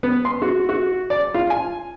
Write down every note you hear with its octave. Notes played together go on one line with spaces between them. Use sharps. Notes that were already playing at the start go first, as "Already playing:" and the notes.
B3
C6
F#4
F#4
D5
F4
G#5